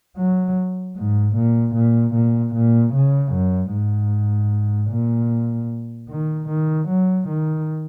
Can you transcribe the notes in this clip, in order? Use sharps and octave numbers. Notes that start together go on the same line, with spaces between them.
F#3
G#2
A#2
A#2
A#2
A#2
C#3
F#2
G#2
A#2
D#3
D#3
F#3
D#3